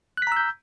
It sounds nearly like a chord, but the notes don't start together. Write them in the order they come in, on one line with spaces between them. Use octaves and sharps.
F#6 B6 A#5 E6 G6